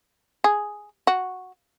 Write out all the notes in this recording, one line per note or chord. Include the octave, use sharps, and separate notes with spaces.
G#4
F#4